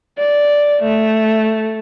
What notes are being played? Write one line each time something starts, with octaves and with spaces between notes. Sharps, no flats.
D5
A3